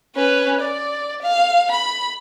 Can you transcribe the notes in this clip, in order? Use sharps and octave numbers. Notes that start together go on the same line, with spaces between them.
C#4 B4
D5
F5
B5